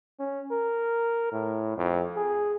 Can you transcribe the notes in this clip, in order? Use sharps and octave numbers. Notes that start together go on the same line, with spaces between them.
C#4
A#4
A2
F2
G#4